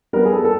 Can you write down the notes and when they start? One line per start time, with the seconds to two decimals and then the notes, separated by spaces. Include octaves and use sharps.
0.13 G3 B3 A#4
0.25 G#4
0.33 A4
0.44 A4